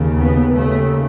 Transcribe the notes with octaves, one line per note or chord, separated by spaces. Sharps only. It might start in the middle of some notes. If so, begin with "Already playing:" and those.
Already playing: D#2 C#3
B3
D#2 C#3 A3